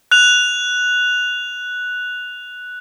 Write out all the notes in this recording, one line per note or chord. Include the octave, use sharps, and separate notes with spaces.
F#6 F7